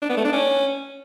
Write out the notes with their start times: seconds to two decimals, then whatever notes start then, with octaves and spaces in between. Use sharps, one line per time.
0.02 D4
0.10 B3
0.17 A3
0.25 D4
0.33 C#4